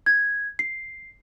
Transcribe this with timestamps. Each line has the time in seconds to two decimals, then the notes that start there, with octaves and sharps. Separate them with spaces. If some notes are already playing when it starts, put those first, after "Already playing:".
0.06 G#6
0.59 C7